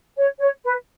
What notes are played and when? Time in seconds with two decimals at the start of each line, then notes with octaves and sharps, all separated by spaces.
0.16 C#5
0.39 C#5
0.64 B4